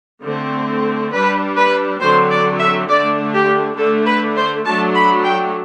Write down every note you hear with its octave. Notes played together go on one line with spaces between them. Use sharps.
D3 A3 C4
G3 D4 B4
B4
D3 F#3 C4 C5
D5
E5
D3 A3 D4 D5
G4
D3 A3 D4 A4
B4
C5
F#3 A3 D4 A5
B5
G5